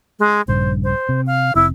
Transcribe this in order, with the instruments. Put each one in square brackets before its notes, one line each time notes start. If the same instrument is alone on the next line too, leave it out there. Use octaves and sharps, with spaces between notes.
[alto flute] G#3
[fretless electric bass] A#1 G2 C#3 [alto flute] C5
[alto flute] C5
[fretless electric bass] C3
[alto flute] F5
[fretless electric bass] F1 C4 [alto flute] E4